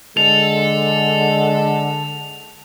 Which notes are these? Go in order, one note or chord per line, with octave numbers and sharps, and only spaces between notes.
D3 G#3 A4 F7